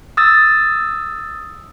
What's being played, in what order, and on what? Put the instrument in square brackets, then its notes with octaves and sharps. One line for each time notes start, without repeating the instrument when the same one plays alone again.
[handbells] D#6 E6 A6